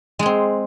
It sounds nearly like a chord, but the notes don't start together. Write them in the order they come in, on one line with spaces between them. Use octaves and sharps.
G#3 G#4 C4